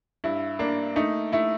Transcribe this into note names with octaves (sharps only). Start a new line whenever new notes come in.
G2 E4
A#3 D4
A3 D#4
A3 E4